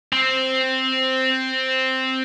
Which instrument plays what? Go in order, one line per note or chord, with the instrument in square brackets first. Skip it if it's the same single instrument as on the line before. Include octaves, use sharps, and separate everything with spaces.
[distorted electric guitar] C4